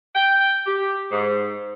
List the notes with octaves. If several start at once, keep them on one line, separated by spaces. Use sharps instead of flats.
G5
G4
G#2